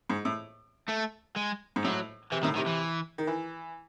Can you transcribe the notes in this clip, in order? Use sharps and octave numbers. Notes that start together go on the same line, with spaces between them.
G#2
A2
A3
G#3
G#2
A2 F#3
C3 E3
A2 D#3
C3 D#3
E3
D#3
E3